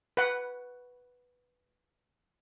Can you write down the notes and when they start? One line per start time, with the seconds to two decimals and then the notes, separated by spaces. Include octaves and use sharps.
0.17 B4 F#5